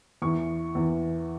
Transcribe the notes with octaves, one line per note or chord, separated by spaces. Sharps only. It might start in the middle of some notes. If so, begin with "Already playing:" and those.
E2 E3 C#6
E2 E3